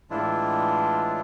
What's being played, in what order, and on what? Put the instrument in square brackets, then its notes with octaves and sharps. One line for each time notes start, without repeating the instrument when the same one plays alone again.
[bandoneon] A2 E3 G#3 D4 E4 F4